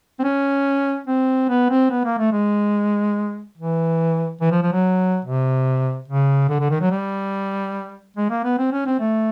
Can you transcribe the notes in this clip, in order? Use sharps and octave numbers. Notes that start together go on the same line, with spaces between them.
C4
C#4
C4
B3
C4
B3
A#3
A3
G#3
E3
E3
F3
F3
F#3
C3
C#3
D3
D3
D#3
F#3
G3
G#3
A#3
B3
C4
C#4
C4
A3